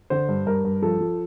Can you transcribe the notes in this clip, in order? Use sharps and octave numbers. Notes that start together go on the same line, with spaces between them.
D3 C5
G2
G2 A#4
G2
F3 A4
F3